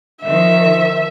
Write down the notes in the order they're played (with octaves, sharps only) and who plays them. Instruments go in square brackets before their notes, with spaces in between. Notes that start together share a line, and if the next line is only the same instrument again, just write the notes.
[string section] D#3 F3 [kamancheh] E5